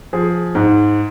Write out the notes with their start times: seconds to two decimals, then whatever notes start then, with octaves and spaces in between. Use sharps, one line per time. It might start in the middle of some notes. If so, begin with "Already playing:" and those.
0.13 F3 G#4
0.55 G#2